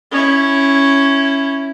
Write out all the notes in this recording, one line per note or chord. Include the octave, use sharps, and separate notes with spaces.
C#4 E4